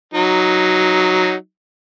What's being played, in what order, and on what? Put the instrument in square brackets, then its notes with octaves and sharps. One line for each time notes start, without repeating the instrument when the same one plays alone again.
[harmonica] F#3 D#4